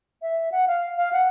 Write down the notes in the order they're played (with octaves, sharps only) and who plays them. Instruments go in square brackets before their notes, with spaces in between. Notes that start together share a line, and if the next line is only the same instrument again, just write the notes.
[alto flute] E5
F#5
F5
F5
F#5